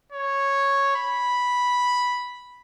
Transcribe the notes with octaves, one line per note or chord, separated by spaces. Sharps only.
C#5
B5